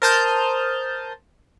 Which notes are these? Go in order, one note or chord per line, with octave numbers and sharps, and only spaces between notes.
A#4 C5 A5 D#6 F6 G6